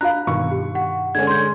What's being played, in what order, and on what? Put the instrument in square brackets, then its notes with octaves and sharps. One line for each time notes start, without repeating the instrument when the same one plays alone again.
[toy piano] D4 F4 F5 [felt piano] A#5 [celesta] F#6
[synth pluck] G2 B2 D#3 [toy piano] D#4 F4 [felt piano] C#6
[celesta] G4
F#5
[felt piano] D3 G#3 C#4 [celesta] G#6
[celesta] C6 G6